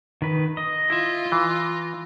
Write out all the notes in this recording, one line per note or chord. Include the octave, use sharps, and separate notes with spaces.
D#3 B4
D#5
E4 F4 E5
E3